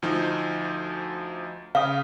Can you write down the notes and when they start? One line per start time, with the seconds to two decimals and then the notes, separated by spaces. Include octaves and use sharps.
0.02 D2 F3 D#4
1.75 C#3 F5 D#6